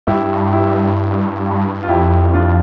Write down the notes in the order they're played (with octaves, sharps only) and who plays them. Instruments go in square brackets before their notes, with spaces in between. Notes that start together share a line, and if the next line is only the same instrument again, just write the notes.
[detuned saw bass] G2 [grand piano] E4 G4
[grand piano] E4 G4
F4
[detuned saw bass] F2 [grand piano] E4 G4
[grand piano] D4 F4